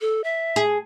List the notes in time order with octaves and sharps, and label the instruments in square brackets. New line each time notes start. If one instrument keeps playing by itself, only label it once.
[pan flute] A4
E5
[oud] G#4